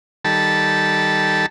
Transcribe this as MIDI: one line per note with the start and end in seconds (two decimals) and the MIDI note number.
0.25 1.46 51
0.25 1.46 55
0.25 1.46 69
0.25 1.46 81
0.25 1.46 83